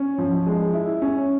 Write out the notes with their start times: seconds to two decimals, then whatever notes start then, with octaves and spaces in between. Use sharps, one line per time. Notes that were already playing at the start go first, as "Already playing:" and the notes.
Already playing: C#4
0.18 F3
0.47 G#3
0.73 E4
1.02 C#4